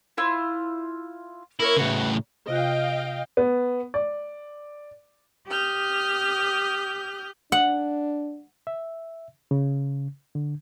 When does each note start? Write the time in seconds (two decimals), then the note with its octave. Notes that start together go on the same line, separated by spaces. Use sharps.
0.17 E4 F4 C5
1.60 A#3 E4 A#4 C#5
1.76 A2 C#3 F#4 B4
2.48 C3 F4 D#5 F5 G5 F#6
3.37 B3
3.94 D5
5.48 G4 D#6 F6 G6
7.52 D4 F#5
8.67 E5
9.51 C#3
10.35 D3